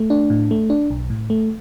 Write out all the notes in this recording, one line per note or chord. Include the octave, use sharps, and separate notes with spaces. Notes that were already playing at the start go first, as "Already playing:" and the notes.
Already playing: A3
D4
A2
A3
D4
B1
A2
A3